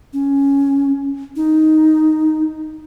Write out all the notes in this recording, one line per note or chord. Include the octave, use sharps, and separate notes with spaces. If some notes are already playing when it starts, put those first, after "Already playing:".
C#4
D#4